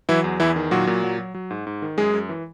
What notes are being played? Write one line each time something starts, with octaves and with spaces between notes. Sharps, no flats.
E3 F#3 E4
E2
E2 E3 E4
D#3
A#2 F#3 F#4
A#2
F#3
F#3
F#3
G#2
G#2
D#3
F#2 G#3 G#4
F#2
E3